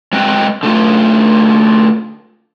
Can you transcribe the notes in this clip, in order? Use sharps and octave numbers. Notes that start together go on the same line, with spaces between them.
G#3 C4 A#4 B4 D#5 G5
D3 A3 F4